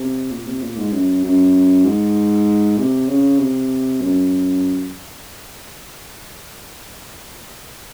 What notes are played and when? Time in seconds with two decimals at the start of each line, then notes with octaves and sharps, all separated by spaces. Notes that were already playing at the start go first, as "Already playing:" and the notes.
Already playing: C3
0.31 A#2
0.46 C3
0.62 A#2
0.77 G#2
0.92 F#2
1.24 F#2
1.85 G#2
2.78 C3
3.09 C#3
3.39 C3
4.01 F#2